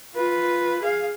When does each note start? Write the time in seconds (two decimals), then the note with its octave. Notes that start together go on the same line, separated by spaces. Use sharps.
0.15 F4 B4
0.82 G#4 F5